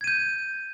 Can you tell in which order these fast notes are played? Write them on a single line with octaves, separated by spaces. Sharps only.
G#6 D#7 G6